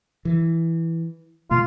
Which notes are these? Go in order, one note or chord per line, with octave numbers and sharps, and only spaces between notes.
E3
B2 G#3 A3 F4